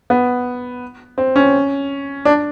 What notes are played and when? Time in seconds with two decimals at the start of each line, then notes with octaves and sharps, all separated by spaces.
0.10 B3
1.18 C4
1.36 C#4
2.25 D4